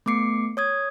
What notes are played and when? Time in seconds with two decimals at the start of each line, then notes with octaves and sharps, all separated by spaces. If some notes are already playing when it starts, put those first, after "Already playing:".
0.06 A3 B3 D6 C7 C#7
0.57 C#5 D#6 G#6